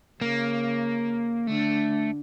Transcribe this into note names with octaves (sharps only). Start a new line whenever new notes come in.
C#3 A#3
D3 A3